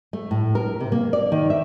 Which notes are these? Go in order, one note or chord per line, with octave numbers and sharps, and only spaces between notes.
A3
A2
A#4
C3
A#3
D5
D#3
E5